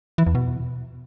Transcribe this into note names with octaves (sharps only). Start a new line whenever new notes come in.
E3
E2
B2